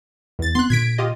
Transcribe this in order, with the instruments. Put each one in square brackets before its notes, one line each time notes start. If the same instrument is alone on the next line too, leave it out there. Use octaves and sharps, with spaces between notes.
[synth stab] E2 A6
[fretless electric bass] B3 C4 [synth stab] C6 F#6
[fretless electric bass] A#2 D3 [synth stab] G#6 B6 D7
[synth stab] F4 G4 D#5